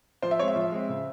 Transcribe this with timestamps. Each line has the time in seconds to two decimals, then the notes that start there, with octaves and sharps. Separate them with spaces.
0.22 F3 C5
0.31 E5
0.39 C4 C#5
0.42 G#3
0.48 E5
0.56 F3
0.72 G#3 C4
0.89 C#3